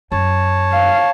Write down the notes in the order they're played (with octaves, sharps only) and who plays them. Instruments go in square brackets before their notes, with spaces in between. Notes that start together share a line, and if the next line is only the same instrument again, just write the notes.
[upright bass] F#2 [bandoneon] C#5 A5
[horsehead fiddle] F5